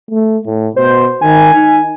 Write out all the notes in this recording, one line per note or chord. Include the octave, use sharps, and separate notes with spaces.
A3
A2
B2 C5
D#3 G#5
D#4